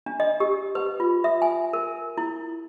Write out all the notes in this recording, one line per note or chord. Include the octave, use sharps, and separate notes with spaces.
D4
D#5
G4
B4
F4
E5
G#5
A#4
E4